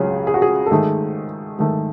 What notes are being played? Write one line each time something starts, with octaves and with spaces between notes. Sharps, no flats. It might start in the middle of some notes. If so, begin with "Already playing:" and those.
Already playing: C#2 C#3 F#3 C#4 G#4
G#4
F#4
G#4
A4
G#2 D#3 A3 G#4
G#2 D#3 A3